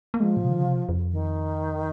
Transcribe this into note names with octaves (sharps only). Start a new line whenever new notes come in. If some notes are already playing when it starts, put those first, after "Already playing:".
A#3
F3 G#3
A#2
C3
D#3
C#3
C3
F2
D#3